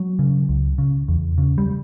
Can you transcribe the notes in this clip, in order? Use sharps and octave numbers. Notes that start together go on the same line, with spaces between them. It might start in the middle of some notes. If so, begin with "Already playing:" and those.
Already playing: F#3
C#3
C#2
C#3
E2
C#3
G3